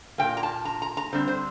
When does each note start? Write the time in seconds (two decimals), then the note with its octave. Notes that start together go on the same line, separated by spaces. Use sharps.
0.18 A#2 G3 A#3 G5
0.37 A#5
0.43 A5
0.65 A#5
0.82 A#5
0.97 A#5
1.13 D3 G3 C4 C5
1.28 C5